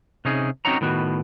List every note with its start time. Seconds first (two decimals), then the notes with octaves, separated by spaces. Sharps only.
0.25 C3 C#4 D#4 G#4
0.65 C4 C#4 D#4 F#4 C#5 A#5
0.81 A2 D#3 B3 F#4